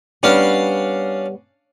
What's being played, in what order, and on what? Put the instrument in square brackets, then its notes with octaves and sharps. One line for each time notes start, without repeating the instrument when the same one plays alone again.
[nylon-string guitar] G3 B3 [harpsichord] C#4 D4 F5